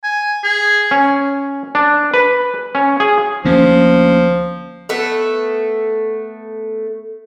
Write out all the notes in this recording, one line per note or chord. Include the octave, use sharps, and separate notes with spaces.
G#5
G#4
C#4
D4
B4
C#4
G#4
D2 F3 A#3 C#4
A3 B3 A4